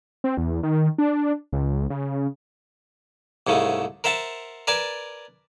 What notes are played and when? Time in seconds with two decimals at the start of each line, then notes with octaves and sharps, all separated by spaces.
0.24 C4
0.37 E2
0.63 D#3
0.98 D4
1.53 C#2
1.90 C#3
3.47 C2 G#2 C#3 A3
4.04 A#4 C5 E5 F#5 A5
4.67 A#4 B4 D5 G#5 A5